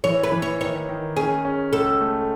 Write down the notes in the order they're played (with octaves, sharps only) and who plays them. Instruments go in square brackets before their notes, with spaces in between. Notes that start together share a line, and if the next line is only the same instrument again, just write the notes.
[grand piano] E3 [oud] C#5
[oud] B4
[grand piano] E3
[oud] C#5
[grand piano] D#3 [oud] C#5
[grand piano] D#3
[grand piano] C#4 [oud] G#4
[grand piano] C#4
[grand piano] C#2 [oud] A4
[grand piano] A3